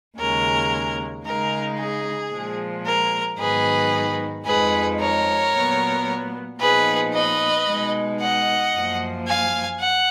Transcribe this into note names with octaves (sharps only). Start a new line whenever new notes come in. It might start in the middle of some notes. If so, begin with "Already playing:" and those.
D#2 C#3 G#3 C#4 A#4
C#3 G#3 D#4 A#4
G#4
A#2 F3 G#3
A#4
G#2 D#3 F#3 B3 D#4 G#4 B4
F2 F3 G#3 D#4 G#4 B4
A#4 C#5
A#2 F#3 B3
A#2 F3 B3 D#4 G#4 B4
B4 D#5
B2 G#3 D#4
D#5 F#5
F#2 F3 A#3
F5 G#5
F#5